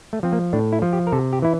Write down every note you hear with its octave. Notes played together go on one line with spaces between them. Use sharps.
A3
F3 C4
A#3
A2 D4
E4
F3
G4
A#4
C3 A4
G4
E3 E4